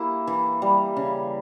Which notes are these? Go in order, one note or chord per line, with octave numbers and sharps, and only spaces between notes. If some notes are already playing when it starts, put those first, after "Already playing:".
Already playing: A#3 E4 G4
E3
G3
C#3